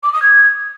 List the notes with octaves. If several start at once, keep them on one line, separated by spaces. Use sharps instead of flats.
D6
D#6
G#6